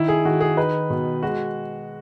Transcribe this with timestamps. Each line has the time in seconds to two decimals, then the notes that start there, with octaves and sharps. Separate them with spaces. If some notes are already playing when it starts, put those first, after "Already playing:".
Already playing: D#3 E4
0.08 G#4
0.25 D#3 F#4
0.41 G#4
0.57 D#4 B4
0.90 B2
1.23 G#3 F#4